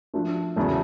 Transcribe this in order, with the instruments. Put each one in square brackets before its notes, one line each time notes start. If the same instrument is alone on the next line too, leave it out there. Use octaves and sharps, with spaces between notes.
[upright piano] F3 A3 D4
E2 C#3 F#3 A3